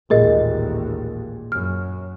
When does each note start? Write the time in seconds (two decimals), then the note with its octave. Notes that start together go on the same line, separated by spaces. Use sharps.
0.10 A1 D#2 A#2 G#3 G#4 A#4 D#5 A6
1.52 F#2 F6